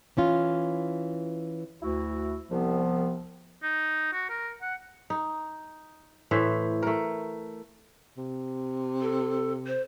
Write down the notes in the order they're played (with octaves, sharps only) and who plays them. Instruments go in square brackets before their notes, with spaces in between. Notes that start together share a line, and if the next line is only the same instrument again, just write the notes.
[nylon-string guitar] E3 C#4 F4
[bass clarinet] D2 [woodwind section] E4 F#4
[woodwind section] C2 B3 [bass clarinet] F3
[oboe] D#4
F#4
A#4
F#5
[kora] D#4
A2 E3 C5 E5
A3 A#4
[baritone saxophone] C3
[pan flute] A4
C5